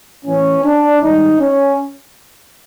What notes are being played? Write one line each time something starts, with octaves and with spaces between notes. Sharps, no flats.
A2 E3 A3 C#4
D4
G#2 D#3 G3 D#4
C#4